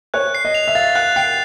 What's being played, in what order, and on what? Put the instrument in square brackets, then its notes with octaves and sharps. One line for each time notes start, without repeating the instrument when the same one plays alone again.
[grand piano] C#5 [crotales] F#6
[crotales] C7
[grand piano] D#5
[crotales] F7
[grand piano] E5
[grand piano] F5 [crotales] A6
[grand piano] F#5 [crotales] F#6
[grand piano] G5 [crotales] C7